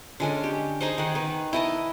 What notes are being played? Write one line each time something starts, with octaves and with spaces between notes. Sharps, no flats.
D3 G#3 C#4
G4
D#4 G#4 C5
D#3 F#5
D#3 B4
E4 D#5 A5